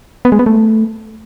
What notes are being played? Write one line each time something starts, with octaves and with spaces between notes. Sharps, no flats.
B3
G#3
B3
A3